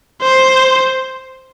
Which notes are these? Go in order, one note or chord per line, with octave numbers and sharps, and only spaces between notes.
C5